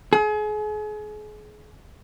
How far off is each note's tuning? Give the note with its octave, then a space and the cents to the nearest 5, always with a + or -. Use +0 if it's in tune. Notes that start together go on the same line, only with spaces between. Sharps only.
G#4 +35